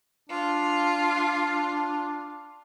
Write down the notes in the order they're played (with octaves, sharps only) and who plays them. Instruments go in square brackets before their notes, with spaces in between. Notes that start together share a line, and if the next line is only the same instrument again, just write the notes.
[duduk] D4 [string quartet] F4